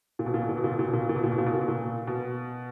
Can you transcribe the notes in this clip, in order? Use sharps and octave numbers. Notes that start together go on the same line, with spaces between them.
A#2
B2
A#2
B2
A#2
B2
A#2
B2
A#2
B2
A#2
B2
A#2
B2
A#2
B2
A#2
B2
A#2
B2
A#2
B2